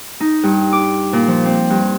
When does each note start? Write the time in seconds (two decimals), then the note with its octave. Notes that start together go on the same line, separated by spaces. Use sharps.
0.20 D#4
0.43 G2
0.73 D6
1.13 A#2
1.27 F3
1.45 C4
1.70 G2